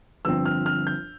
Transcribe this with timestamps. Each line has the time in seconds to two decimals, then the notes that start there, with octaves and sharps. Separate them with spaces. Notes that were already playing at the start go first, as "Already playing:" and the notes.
0.25 G1 G2 F3 C4 E6
0.46 F6
0.66 F6
0.87 G6